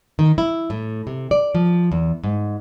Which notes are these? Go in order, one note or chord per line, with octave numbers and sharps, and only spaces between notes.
D#3
E4
A2
C3
D5
F3
E2
G#2